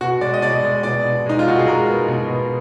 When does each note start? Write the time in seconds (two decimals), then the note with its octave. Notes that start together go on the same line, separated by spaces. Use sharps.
0.01 B2 F#4
0.21 G#3 D5
0.34 D#5
0.42 B2 D5
0.63 G#3
0.83 B2 D5
1.05 B2
1.26 G#3 D#4
1.39 F4
1.47 B2 F#4
1.58 G#4
1.66 G#3 A#4
1.88 B3
2.08 B2
2.30 B3